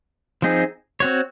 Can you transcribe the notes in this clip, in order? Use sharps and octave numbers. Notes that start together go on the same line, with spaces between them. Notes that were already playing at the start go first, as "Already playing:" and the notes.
F3 C4 D#4 G#4
C4 F#4 C#5